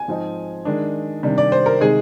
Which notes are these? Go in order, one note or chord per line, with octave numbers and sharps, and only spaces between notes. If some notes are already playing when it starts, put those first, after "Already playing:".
Already playing: G#5
G#2 F3 C4 D#4
D#3 G#3 D4
C3 D#3 G3 D4
D5
C5
A#4
C3 D#3 G#3 D#4 G#4